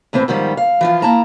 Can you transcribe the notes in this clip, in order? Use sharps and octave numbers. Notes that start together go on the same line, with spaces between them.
E2 A2 E3 C4
G#2 D#3 F3 G3
F5
E3 F3 F4
A#3 E4 A5 A#5